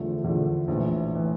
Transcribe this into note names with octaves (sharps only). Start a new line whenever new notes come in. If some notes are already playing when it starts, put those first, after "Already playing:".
Already playing: E2 D3 F3 A3
E2 D3 F3 A3
A#1 A2 E3
A2 E3